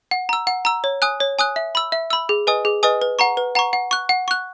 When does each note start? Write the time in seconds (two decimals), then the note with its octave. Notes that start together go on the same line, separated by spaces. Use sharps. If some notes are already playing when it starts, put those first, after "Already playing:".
0.11 F#5
0.29 A#5 E6
0.47 F#5
0.65 A#5 E6
0.84 C#5
1.02 G#5 D#6 F#6
1.20 C#5
1.39 G#5 D#6 F#6
1.56 E5
1.75 B5 E6
1.92 E5
2.10 B5 E6
2.29 G#4
2.47 B4 D#5 G#5 D#6
2.65 G#4
2.83 B4 D#5 G#5 D#6
3.02 B4
3.19 F#5 A#5 C#6
3.37 B4
3.55 F#5 A#5 C#6
3.73 F#5
3.91 C#6 F#6
4.09 F#5
4.28 C#6 F#6